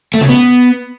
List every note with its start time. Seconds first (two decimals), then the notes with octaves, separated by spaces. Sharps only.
0.14 A3
0.21 C#3
0.29 B3